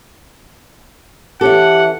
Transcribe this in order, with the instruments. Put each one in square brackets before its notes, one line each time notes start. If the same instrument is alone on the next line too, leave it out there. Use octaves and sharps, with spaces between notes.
[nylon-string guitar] E3 C#4 A4 [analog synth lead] G4 [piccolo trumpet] F#5